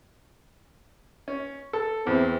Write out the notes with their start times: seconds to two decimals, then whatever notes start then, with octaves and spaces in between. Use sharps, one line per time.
1.28 C#4
1.73 A4
2.07 E2 E3 C4